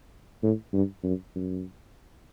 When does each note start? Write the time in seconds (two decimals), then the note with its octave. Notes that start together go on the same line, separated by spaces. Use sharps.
0.43 A2
0.73 G2
1.04 F#2
1.35 F#2